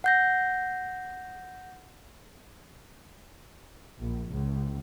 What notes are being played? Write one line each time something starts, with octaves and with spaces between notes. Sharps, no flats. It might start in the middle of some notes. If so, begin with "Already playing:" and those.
F#5 G6 A#6
A#1
C#2